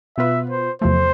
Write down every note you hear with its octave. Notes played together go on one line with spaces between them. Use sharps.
B2 B3 F4 B4 E5
C5
E2 C3 F3 A3 C5